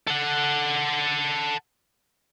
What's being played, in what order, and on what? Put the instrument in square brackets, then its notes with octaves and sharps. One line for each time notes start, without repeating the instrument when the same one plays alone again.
[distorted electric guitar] A4 F#5